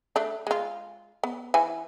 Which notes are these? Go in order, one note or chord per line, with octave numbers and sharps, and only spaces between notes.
A3 D4
G#3 F4
B3
E3 B4 G#5